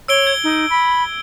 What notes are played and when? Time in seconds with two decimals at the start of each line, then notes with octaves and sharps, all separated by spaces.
0.08 C#5 E6 D7 G7
0.27 G#6
0.43 D#4
0.70 B5